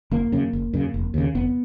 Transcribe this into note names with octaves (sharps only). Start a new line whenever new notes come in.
F#1 A#3
F#2 C#3
F#1
F#2 C#3
F1
D#2 C#3
F1 B3